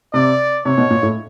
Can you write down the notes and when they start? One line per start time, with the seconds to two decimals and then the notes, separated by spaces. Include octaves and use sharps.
0.14 C3 D5
0.65 C3 C#5
0.78 B2
0.90 A#2
1.03 A2